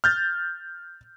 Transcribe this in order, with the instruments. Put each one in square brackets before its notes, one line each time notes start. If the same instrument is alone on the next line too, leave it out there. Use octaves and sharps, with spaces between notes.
[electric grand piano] F6 G6 A6